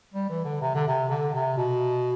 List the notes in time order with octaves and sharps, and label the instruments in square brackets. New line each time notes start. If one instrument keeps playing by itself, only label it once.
[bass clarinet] G3
E3
D3
C3
D3
C3
D3
C3
B2